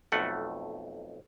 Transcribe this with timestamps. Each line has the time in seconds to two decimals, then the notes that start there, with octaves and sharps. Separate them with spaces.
0.12 B1 F2 A3 F#5